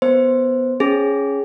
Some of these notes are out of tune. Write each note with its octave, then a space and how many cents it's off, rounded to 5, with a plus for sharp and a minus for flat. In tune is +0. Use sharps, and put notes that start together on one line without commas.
B3 +0 C5 +0
C#4 +0 G#4 +0